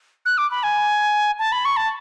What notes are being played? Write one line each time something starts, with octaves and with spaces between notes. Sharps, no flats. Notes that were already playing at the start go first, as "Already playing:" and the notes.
F#6
D6
B5
G#5
A5
B5
C#6
A5